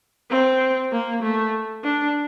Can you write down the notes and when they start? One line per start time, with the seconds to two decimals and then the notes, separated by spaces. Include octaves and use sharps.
0.30 C4
0.92 A#3
1.23 A3
1.84 D4